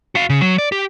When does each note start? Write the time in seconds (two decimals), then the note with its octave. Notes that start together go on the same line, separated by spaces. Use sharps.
0.15 F#4 F5
0.30 C#3
0.41 F#3
0.58 D5
0.72 G4